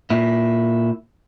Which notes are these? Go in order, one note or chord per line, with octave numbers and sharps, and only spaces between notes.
A#2 E4